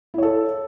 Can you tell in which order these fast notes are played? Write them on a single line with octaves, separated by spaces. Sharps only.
E4 C#5 A4